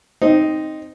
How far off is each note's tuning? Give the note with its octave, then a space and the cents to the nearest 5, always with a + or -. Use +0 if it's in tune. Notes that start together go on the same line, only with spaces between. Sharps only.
C4 +0 D#4 +0